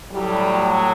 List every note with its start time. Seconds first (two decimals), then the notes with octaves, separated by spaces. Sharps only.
0.12 A2 F#3 G3